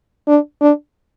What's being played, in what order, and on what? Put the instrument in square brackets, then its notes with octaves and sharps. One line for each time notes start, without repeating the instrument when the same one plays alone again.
[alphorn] D4
D4